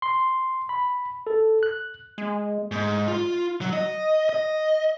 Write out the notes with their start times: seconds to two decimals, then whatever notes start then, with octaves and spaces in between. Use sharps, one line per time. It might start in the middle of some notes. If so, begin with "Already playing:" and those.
0.02 C6
0.69 B5
1.27 A4
1.63 F#6
2.18 G#3
2.72 G#2
3.08 F4
3.61 F#3
3.73 D#5
4.29 D#5